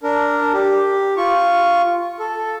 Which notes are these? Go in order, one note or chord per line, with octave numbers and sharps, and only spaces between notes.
D4 A#4
G4
F4 C#6
A4